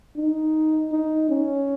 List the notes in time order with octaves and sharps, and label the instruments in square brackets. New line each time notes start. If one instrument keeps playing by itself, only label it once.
[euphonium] D#4
D#4
C#4